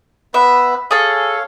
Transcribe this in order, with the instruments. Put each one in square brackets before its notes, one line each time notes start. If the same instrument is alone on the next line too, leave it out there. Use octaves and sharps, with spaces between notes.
[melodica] B3 B4 [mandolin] E5
[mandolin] G#4 A4 [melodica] C#5 F5